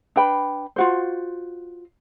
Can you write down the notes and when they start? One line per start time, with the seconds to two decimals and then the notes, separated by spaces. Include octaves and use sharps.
0.16 D4 B4 G5 B5
0.76 F4 F#4 C5